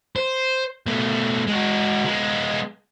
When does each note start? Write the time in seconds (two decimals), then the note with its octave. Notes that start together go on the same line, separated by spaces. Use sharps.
0.16 C5
0.86 B2 A3
1.47 G#3 F#4
2.06 G#3 B3